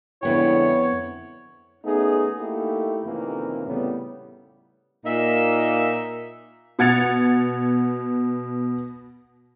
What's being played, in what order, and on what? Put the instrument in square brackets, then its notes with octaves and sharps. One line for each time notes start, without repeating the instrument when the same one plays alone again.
[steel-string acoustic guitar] F2 B3 G5 [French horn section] D3 G#3 E4 [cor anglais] C#5
[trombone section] A3 B3 C#4 D#4 G#4
A3 A#3 D#4 E4 G4 A4
F2 C3 D#3 E3 A#3 C#4
A2 C#3 G3 B3
[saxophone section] A#2 A#3 D#4 E5
[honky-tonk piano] B2 F#5 G#6 A6 C#7 F7